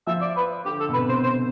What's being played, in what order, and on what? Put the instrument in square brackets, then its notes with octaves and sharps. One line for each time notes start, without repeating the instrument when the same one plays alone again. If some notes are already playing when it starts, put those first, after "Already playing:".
[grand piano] F3 [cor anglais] E5
[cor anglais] D5
B4
[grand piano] D3 [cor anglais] G4
[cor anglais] A4
[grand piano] B2
[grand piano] C3 [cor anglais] B4
[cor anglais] C5
C5